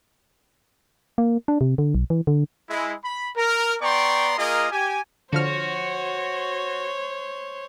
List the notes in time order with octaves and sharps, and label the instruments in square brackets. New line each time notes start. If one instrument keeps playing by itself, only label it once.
[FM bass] A#3
D4
C3
D3
B1
E3
D3
[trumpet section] G#3 E4
B5
A#4
B3 D5 G5 A#5 C6 C#6
A#3 F4 G#4 A#4 D#5
G4 G#5
[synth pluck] D3 F3 F6 [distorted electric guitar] F#4 [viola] C5 C#5